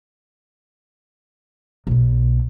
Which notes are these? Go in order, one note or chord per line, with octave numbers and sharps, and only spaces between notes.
B1 B2